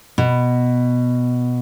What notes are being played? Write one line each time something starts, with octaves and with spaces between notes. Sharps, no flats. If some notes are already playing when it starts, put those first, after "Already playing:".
B2